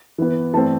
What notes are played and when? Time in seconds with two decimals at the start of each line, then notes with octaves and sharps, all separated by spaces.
0.18 E3 B3
0.53 E3 A3 C4 A5